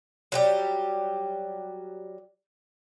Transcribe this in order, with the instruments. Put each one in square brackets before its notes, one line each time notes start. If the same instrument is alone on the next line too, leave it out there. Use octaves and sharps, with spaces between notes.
[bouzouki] F#3 G3 G4